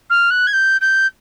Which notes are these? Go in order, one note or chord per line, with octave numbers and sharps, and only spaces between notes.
F6
F#6
G#6
G6
G6